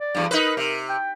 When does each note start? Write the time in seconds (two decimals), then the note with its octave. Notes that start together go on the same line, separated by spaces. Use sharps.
0.01 D5
0.15 E2 G2
0.31 D#4 A#4 B4
0.57 C3
0.89 G5